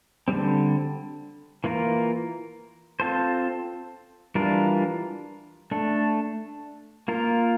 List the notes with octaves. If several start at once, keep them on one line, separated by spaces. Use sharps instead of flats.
D3 G3 C4
E3 A#3 F4 A#4
C4 F4 A4 C5
E3 G3 D4 F4 A#4
A3 D4 A4
A#3 F4 A#4